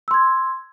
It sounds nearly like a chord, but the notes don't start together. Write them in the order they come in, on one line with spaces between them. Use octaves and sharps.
E6 C6 G#6